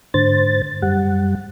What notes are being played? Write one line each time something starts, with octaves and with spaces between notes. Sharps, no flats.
G#2 D3 C5 A6
F#2 G3 F#5